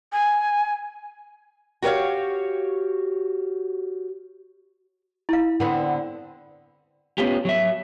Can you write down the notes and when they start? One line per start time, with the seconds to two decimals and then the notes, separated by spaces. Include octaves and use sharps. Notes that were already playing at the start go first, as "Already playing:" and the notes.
0.13 G#5
1.82 F#4 G4 B4 C#5 F5
5.29 E4 F5
5.60 D3 B3 C4
7.18 B3 C#4 F4 G4
7.45 F#3 E5